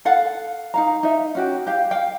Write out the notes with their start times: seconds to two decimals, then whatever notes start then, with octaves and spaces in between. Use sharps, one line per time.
0.05 A4 F5 F#5
0.74 D#4 F5 A#5
1.03 D#4 E5
1.35 C#4 F#4 G4
1.67 G4 F5
1.91 F5 G5